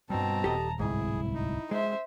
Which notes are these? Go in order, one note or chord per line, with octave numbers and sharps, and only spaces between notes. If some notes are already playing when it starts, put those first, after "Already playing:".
G2 B2 G3 C4 A5 A#5
D#1 G4 A4 D#5
D1 C2 G#2 E4 G#4
D#4
G#3 C5 E5